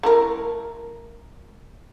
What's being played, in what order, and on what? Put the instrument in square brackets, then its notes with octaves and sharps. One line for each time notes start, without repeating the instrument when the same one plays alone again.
[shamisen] A3 E4 A#4